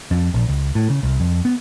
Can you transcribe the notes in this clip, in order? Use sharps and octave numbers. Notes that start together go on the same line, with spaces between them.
F2
A#1
C#2
A2
C#3
C2
F2
B3